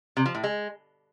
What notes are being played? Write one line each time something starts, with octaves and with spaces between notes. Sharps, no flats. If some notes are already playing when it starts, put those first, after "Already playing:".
C3
F3
A2
G#3